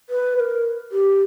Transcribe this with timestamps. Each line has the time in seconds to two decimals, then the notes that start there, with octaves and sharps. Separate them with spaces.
0.10 B4
0.36 B4
0.40 A#4
0.92 G4